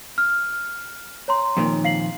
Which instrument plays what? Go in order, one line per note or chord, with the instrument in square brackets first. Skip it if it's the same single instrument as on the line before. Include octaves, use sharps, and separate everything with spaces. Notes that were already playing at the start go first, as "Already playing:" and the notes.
[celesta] F6
C#5 A#5 C6
[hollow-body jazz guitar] F2 A#2 D#3
[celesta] F5 C7 F#7